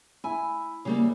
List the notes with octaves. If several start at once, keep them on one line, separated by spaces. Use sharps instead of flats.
E4 G#5
C#3 G3 A#3